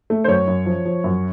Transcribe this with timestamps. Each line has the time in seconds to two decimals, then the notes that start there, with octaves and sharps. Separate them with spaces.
0.10 A3
0.24 C5
0.28 F#2 C#5
0.47 F#2
0.66 F3
0.85 F3
1.04 F#2